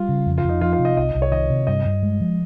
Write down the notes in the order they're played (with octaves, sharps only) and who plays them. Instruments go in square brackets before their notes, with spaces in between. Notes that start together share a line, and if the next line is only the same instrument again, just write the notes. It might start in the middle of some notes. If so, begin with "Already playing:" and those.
Already playing: [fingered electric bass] G3 [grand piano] F4
[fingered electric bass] C#3
F2
[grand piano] F4
[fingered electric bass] F2
[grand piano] D#4
[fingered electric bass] F3 [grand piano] F4
[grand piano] F4
[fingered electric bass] C3
[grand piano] D#5
[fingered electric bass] C2 [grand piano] D#5
[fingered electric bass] C2
[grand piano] C#5
[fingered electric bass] D#3 [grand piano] D#5
[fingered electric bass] C3
[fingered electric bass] G2 [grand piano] D#5
[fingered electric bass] G2
G#3
F3